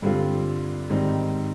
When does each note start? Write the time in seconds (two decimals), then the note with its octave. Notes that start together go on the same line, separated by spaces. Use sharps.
0.02 G2 D3 G3 C4 F4
0.90 G#2 D#3 G3 C4 D#4